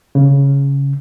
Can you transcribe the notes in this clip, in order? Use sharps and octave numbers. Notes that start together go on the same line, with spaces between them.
C#3